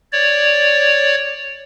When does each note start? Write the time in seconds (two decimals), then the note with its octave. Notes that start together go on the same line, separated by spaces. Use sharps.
0.12 C#5 D5